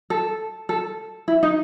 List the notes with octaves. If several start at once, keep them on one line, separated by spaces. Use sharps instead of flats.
A4
A4
E4
D#4